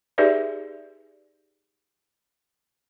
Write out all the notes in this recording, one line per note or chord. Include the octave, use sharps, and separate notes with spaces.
D#4 G4 G#4 B4 D5 E5